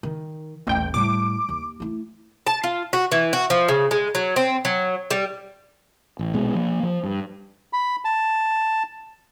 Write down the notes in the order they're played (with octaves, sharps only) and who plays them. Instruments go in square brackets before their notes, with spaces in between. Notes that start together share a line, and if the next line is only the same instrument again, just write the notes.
[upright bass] D#3
[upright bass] D#1 [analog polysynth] A1 G5
[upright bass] A2 G3 [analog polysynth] D6
[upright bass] D#2
A3 E4
[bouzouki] A5
F4
F#4
E3
F#4
F3
C#3
G#3
F#3
C4
F#3
G3
[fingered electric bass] A1
A#1 B2 G#3
F3 A#3
F3
G2
[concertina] B5
A5